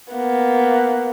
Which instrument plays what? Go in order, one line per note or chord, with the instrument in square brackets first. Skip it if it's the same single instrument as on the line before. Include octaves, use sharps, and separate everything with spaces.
[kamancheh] A#3 B3